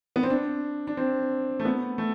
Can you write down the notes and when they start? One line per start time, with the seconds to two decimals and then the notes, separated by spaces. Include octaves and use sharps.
0.16 B3
0.23 C4
0.30 D4
0.87 D4
0.97 C4
1.60 A3
1.65 B3
1.98 A3